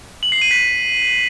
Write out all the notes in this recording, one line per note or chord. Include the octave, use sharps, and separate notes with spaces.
F#7
C7
D#7
B6